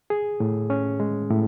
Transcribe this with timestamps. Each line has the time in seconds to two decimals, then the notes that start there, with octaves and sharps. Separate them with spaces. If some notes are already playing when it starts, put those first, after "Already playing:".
0.10 G#4
0.40 A2
0.70 C#4
1.00 G#3
1.30 A2